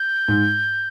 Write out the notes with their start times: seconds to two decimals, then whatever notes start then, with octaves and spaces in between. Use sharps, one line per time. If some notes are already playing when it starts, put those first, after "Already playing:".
Already playing: G6
0.28 G#2